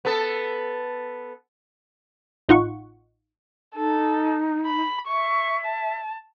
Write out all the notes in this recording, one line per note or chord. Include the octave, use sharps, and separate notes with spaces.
B3 A4
A1 D#4 F4 F#5 C#6
D#4 A4
B5
E5 C#6
A5